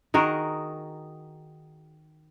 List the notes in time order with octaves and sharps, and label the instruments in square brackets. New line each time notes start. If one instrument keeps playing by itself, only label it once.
[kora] D#3 F#4 G#4 A#4